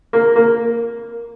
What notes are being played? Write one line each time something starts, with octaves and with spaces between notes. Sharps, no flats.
A#3
A#3